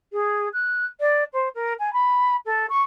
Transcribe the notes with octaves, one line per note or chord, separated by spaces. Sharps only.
G#4
F#6
D5
C5
A#4
G#5
B5
A4
C#6